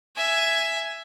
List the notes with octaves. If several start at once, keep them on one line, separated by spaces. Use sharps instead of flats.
E5 G#5